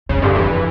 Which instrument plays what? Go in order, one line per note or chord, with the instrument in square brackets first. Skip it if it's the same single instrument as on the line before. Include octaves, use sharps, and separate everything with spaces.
[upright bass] F2 [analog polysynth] C#3
[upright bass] G2 [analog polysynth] D3
[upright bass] F2 [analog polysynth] E3